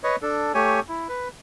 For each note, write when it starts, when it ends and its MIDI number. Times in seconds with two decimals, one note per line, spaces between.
0.04 0.16 71
0.04 0.16 73
0.04 0.16 75
0.22 0.52 62
0.22 0.52 69
0.54 0.80 57
0.54 0.80 67
0.54 0.80 73
0.54 0.80 80
0.89 1.08 64
1.09 1.28 71